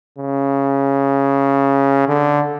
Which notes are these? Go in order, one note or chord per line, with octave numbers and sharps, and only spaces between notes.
C#3
D3